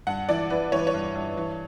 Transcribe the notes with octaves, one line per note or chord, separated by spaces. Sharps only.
G2 F#5
E3 D5
E3 B4
E3 C#5
B4
C#5
G2
G2
E3